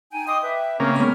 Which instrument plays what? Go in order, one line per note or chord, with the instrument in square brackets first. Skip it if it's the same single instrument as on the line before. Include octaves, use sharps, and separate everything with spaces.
[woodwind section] D#4 G5 G#5
[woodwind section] D#5 C6 D#6 [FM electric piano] G5 D6
[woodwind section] B4 E5
[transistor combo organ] C#3 A#3 [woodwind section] A3 C4
[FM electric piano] G#3 B3 C#5 [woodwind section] C#4 B5 F6